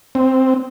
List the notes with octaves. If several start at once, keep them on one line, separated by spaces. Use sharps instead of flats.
C4